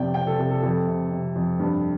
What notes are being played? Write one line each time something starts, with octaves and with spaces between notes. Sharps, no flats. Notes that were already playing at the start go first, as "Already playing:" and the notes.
Already playing: F2 C3 D5 G5
C3 G5
A4
C3 A4
A4
F2 A4
C3
C3
F2
G2